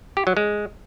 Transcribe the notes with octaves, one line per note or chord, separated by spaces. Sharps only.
G4
F#3
G#3